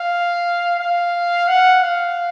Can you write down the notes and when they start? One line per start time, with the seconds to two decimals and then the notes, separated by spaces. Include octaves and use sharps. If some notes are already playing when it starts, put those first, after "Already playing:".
Already playing: F5
0.79 F5
1.48 F#5
1.83 F5